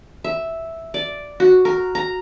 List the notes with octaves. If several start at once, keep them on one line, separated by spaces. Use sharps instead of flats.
E5
D5
F#4
A#4
A#5